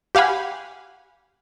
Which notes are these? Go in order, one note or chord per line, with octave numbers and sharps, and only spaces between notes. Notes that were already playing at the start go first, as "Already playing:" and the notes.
G4 F5 F#5 G#5 B5